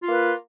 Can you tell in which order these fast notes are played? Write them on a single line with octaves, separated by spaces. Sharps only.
F4 A#3 B4